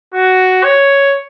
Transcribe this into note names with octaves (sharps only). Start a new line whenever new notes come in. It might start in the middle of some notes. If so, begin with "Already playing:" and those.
F#4
C#5